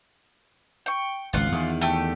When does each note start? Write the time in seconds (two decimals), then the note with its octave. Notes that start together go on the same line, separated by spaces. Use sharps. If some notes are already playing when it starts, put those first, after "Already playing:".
0.86 G5 C#6
1.33 G#1 C#2 F4 F#5
1.52 E2 D#3
1.81 A3 G4